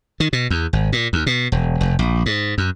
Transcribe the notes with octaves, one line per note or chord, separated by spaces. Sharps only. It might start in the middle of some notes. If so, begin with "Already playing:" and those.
D#3
B2
E2
G#1
A#2
D#2
B2
E1
F1
A#1
G#2
F#2